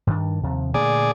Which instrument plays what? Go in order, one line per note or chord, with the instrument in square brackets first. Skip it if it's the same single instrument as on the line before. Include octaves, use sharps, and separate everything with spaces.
[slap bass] G2 D#3 D4
D#2 C3 F3
[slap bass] A#2 D3 A3 [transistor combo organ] G#4 D5